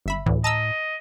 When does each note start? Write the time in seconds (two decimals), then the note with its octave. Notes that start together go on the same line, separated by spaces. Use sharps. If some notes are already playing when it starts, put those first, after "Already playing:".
0.06 G1 E5 B5
0.26 D2 A2 E3
0.44 D#5 A5 A#5 E6